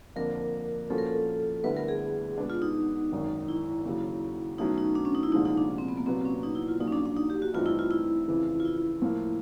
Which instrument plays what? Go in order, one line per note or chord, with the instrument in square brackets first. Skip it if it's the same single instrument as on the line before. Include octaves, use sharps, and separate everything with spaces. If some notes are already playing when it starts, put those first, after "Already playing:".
[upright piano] F2 D3 F3 A#3 D4 [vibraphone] A#4
[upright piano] A#2 F3 A#3 C#4 F#4 [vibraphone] A4
[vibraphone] A#4
A4
[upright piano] D2 D3 G3 B3 E4 [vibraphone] B4
[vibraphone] A#4
G#4
[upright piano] B2 G#3 B3 D4
[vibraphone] F4
D#4
[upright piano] G#1 F#2 D#3
[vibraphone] E4
[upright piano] D#2 C#3 F#3
[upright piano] B2 F#3 A3 C#4 [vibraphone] D#4
[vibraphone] D#4
D4
C#4
D#4
E4
[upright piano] C2 A#2 F3 G#3 C#4 [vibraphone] D#4
[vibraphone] D#4
D4
C4
B3
A#3
[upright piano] C2 A#2 F#3 B3 [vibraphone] C4
[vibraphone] C#4
D#4
E4
F4
[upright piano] A#1 A#2 F#3 [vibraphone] D#4
[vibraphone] C#4
D4
D4
D#4
G4
F#4
[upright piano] G2 E3 A3 C4 D#4 [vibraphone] F4
[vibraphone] E4
F4
E4
[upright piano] F2 C#3 E3
[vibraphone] F4
E4
[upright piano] A2 F3 A#3